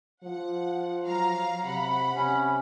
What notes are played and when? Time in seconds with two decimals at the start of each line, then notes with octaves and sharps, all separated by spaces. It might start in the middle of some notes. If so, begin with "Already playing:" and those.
0.24 F3 F#5
1.04 F#3 F5 A#5
1.64 C3 F#5 B5
2.15 C3 C#4